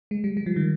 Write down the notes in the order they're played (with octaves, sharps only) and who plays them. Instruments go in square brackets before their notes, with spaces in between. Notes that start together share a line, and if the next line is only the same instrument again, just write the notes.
[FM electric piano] G#3
G3
G3
F3
D#3